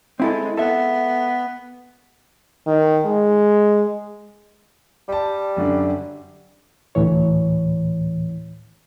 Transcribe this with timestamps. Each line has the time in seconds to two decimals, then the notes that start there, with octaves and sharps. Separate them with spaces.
0.20 G#3 C4 E4 A4
0.57 B3 A4 E5
2.67 D#3
3.05 G#3
5.08 G3 G5 A5
5.57 F#2 D3 D4
6.95 D2 A2 E3 C#5